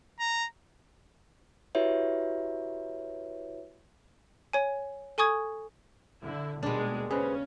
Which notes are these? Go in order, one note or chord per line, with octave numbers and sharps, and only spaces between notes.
A#5
E4 F#4 G4 B4 C#5 E5
C#5 G#5
A4 G#5 C#6 D#6 G#6
D3 E4
D#2 B2 G3 G#3 D4
C#3 C#4 G#4 B4 C5